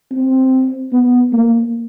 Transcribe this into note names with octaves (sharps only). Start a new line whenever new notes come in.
C4
B3
A#3